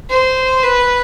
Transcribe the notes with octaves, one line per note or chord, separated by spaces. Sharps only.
C5
B4